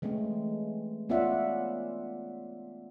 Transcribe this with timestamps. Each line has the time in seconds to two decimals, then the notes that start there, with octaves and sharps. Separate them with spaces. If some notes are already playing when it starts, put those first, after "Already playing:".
0.02 E3 G#3 A3 C4 C#4
1.09 B3 C#4 F4 D5 E5 F#5